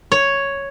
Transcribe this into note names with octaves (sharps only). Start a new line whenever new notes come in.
C#5